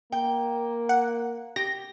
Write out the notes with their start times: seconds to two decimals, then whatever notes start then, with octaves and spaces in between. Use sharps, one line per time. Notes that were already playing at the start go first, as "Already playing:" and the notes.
0.12 A#3 G5
0.89 F#5
1.56 G4 A#6